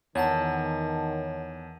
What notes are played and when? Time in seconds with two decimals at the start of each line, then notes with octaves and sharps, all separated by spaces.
0.15 E2 D#3 C#5 F#5 A5